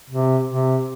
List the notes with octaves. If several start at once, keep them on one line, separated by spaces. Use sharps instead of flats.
C3
C3